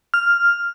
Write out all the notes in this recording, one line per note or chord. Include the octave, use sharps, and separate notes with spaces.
F6